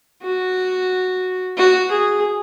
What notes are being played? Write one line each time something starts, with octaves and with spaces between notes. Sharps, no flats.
F#4
F#4
G#4